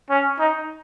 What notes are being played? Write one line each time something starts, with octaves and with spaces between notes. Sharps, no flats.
C#4
D#4